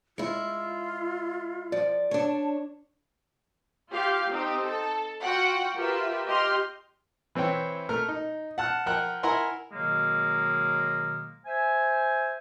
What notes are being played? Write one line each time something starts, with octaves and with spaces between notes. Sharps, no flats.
G#3 E4 F4
F3 D5
D4 C#5 A5
F4 G4 F5
C4 D#4 G4
A4
F4 F#4 F#5 G5
F4 G4 A#4 B4 E5
G4 D#5 C6 F6
E3 C4 E4 C#5 G5
A3 A#4 F6
D#4
F#5 A5 F6 F#6
F3 A#4 F#5 G5 F#6
E4 A#4 F#5 G#5 A#5 C6
B2 D#3 F#3 G#3 A#3
C5 E5 G#5